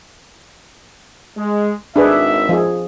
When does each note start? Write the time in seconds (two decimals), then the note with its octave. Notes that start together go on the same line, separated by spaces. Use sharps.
1.36 G#3
1.96 G#1 D4 G#4 B4 E5
2.49 F3 G#4